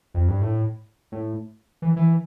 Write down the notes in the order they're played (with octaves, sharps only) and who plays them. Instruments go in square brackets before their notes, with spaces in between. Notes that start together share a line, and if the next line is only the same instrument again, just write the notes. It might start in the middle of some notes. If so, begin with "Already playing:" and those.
[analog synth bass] F2
G2
A2
A2
E3
E3